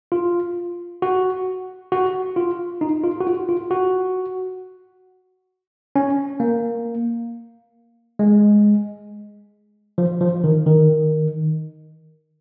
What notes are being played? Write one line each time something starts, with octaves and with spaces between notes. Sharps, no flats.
F4
F#4
F#4
F4
D#4
F4
F#4
F4
F4
F#4
C#4
A#3
G#3
F3
F3
D#3
D#3